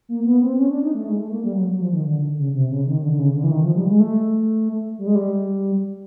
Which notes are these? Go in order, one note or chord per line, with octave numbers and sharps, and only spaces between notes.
A#3
B3
C4
C#4
D4
D#4
A3
G#3
A3
A#3
G3
F#3
F#3
F3
D#3
D3
C#3
C3
C#3
D#3
D3
D3
C#3
D3
E3
D#3
F3
G3
G#3
A3
G3
G#3
G3